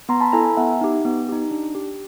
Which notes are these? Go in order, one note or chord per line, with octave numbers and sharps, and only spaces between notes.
B3 A#5 C6
A5 B5
E4 A4 G#5 A#5
G#5 A#5
B3 E5 F#5
D#4 G4
B3
D#4 G4
D4
G4